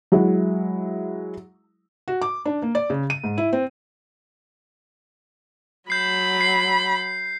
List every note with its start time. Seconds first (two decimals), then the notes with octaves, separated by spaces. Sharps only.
0.12 F#3 G#3 E4
2.08 F#4
2.22 D6
2.45 D4
2.62 A#3
2.75 D5
2.90 C#3
3.10 D#7
3.24 G#2
3.38 E4
3.53 C4
5.90 F#3 B5 G6 C7
6.41 C7